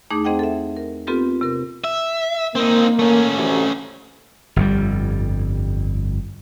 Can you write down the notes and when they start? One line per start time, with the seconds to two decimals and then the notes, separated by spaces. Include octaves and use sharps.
0.11 E2 A3 D#4 G#4 D6
0.24 C4 G#4 C5 D#5 F#5 G5
0.39 A4 E5
0.77 A#4
1.07 B3 C4 F4 G4 A4 B4
1.41 C3 A#4
1.84 E5
2.55 A#3 C4 D#4
2.99 A3 C#4
3.35 A1 D2 C3
4.56 G1 F2 G3